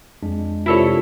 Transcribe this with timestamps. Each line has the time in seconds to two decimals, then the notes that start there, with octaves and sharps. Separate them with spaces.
0.23 F2 G#3 D4
0.66 C3 E4 F4 A4 A#4 C#5 D5